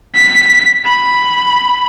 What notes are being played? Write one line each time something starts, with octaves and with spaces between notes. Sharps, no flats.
B6
B5